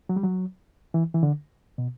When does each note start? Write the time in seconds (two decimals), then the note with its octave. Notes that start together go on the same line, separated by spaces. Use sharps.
0.09 F#3
0.16 G3
0.24 F#3
0.94 E3
1.15 E3
1.23 D3
1.78 B2